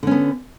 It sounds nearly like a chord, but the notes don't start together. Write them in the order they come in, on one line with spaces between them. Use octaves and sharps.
D3 C#4 B3